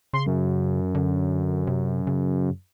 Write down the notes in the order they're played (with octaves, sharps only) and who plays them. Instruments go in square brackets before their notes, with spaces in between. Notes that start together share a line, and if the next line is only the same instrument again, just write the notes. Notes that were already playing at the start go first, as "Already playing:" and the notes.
[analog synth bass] C#3 [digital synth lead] C6
[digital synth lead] F#2
[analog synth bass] D3
C3
C#3